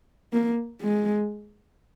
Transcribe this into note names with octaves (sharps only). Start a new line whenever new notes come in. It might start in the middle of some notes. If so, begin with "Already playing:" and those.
A#3
G#3